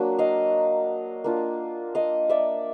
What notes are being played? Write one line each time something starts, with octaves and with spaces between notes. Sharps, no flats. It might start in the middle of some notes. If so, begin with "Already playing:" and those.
Already playing: F#3 A#3 D4
D#5 F5
A#3 D4 F4
D#5 F5
D5 E5